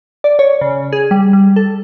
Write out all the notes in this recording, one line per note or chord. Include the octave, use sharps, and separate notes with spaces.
D5
C#5
C#3
G#4
G3
G3
A4